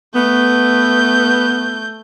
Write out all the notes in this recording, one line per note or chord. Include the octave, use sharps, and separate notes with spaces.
A3 B3 G6